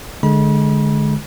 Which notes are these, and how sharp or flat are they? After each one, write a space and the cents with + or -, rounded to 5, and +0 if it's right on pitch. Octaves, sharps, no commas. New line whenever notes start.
D3 +15 G#3 +20 B5 -35